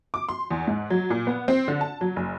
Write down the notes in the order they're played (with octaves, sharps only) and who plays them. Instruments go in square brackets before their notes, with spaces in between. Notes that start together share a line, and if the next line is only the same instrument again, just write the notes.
[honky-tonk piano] D6
C6
E2
G#2
F#3
A#2
B3
C4
D3
A5
F#3
F#1